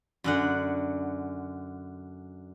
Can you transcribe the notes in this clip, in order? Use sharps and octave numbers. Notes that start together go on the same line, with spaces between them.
F#2 D3 F#5